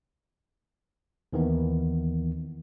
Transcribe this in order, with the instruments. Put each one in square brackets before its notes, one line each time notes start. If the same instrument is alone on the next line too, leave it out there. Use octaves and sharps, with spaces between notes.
[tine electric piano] D#2 D#3 E3 B3